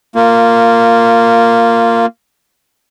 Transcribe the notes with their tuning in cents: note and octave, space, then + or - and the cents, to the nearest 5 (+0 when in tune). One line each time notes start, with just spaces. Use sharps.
A#3 -10 F4 +0